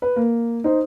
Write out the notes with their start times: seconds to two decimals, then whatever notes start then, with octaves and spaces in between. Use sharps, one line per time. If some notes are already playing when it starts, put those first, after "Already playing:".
0.02 B4
0.16 A#3
0.64 D#4 C5